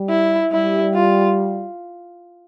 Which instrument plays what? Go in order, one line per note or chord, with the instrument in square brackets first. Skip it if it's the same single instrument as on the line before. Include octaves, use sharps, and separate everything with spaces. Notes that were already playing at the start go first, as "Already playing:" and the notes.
Already playing: [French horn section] G3
[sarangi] E4
[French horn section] G3 [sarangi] E4
[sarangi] F4